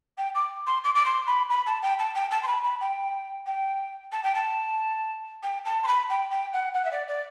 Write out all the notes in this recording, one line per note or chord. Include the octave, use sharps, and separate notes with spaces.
G5
D6
C6
D6
D6
C6
B5
B5
A5
G5
A5
G5
A5
C6
B5
B5
G5
G5
A5
G5
A5
G5
A5
C6
B5
G5
G5
F#5
F#5
E5
D5
D5